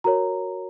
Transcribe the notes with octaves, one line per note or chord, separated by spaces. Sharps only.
F#4 A#4 C#5 A#5